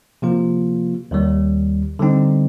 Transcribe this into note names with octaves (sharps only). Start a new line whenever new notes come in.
C3 F3 A#3 F4
D#2 D#3 G3
D3 G3 C4 D#4